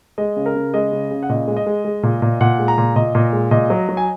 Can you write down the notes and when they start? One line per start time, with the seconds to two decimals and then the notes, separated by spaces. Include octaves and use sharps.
0.18 G#3 D#5
0.36 C#3
0.46 A#4
0.55 C#3
0.74 G#3 D#5
0.92 C#3
1.11 C#3
1.23 F#5
1.29 A#2 D#5
1.48 G#3
1.57 D#5
1.66 G#3
1.85 G#3
2.03 A#2
2.22 A#2
2.41 A#2 F#5
2.59 G#3
2.68 A#5
2.78 A#2
2.96 A#2 D#5
3.15 A#2
3.33 G#3
3.51 A#2 D#5
3.70 F#3
3.89 F#3
3.97 G#5